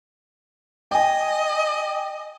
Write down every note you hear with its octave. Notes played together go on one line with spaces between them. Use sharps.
D#5 G5 G#5